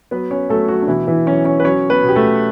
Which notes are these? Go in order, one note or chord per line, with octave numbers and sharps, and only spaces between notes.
F#3 B3 B4
C#4 C#5
F#3 A3 A4
F#3 F#4
D4
B2 E3 E4
E3 E4
F#3 C#4 C#5
C#4 C#5
B4
F#3 C#4 C#5
B3 B4
B2
G4
A3 A4